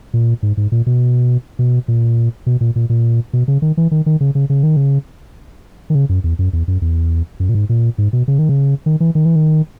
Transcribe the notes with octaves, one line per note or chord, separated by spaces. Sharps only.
A#2
G#2
G#2
A#2
B2
B2
A#2
B2
A#2
A#2
A#2
B2
C#3
D#3
E3
D#3
D#3
C#3
C#3
C#3
D#3
C#3
D#3
C#3
F#2
E2
F#2
E2
F#2
E2
F#2
A#2
G#2
A#2
G#2
B2
C#3
D#3
C#3
D#3
E3
D#3
E3
D#3